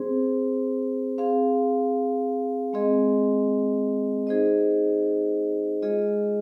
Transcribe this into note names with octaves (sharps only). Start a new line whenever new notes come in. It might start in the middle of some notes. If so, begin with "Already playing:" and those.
Already playing: C4 G#4 C5
C4 G#4 F5
G#3 C4 G#4 D#5
D#4 G#4 C5 D#5
G#3 F4 G#4 D#5